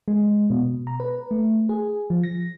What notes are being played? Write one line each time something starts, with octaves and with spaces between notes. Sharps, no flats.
G#3
B2
A#5
B4
A3
G#4
F3
A#6